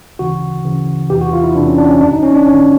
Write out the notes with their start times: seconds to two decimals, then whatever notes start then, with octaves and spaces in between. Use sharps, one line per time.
0.19 D2 C#3 E3 F#4
0.65 D2 C#3 E3
1.10 E2 C3 E3 G4
1.21 F#4
1.33 F4
1.44 E4
1.55 E2 C3 E3 D4
1.67 C#4
1.78 D4
1.90 C#4
2.01 G#1 F#2 D3 D4
2.12 D#4
2.23 C#4
2.35 D4
2.46 G#1 F#2 D3 C#4